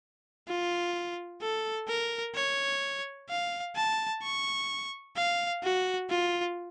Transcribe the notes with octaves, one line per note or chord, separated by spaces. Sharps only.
F4
A4
A#4
C#5
F5
A5
C#6
F5
F#4
F4